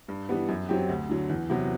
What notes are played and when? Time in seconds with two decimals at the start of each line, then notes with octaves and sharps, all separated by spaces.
0.08 G2
0.29 E3 G3 B3
0.49 F#2
0.69 F#3 C4 G4
0.89 D2
1.09 D3 F#3
1.29 E2
1.50 C3 F#3 B3